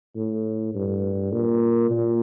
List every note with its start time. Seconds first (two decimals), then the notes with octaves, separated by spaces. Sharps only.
0.16 A2
0.75 G2
1.32 A#2
1.90 A#2